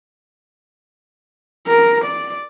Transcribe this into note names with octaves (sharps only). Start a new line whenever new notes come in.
A#4
D5